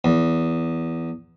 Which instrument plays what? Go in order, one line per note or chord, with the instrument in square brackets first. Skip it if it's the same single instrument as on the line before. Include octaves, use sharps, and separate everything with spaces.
[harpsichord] E2